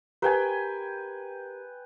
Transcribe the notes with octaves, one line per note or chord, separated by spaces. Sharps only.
G4 A#4 B4 G5 G#5 A#5